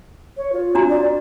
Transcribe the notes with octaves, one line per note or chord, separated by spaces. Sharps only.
C#5
F4
D4 F#4 A#5
D5